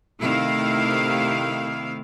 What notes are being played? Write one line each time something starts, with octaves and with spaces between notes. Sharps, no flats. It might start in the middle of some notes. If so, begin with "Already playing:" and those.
C3 D#3 A3 E4 F5